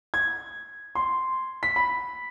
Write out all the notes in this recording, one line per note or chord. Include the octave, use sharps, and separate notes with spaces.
G#6
C6
B6
B5